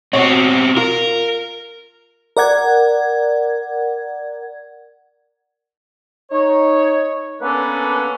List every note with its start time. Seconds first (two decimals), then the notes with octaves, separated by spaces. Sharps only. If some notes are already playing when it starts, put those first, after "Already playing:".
0.13 B2 C4 F#4 C#5
0.77 F4 A#4
2.37 A#4 D5 F#5 G#6
6.31 D#4 C#5
7.41 A#3 B3 C#4 D4 A4 B4